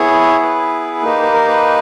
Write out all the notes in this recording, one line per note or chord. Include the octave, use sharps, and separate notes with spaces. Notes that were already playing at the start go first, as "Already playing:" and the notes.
Already playing: B3 E4 G#4 C#5
B4
A#3 D#4 G4
B4
A#4
B4